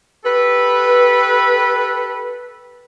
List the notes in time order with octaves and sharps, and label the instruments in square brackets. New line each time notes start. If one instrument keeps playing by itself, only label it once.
[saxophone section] G4 A4 B4